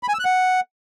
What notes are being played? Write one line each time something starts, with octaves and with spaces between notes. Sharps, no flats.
B5
G#5
E6
F#6
F#5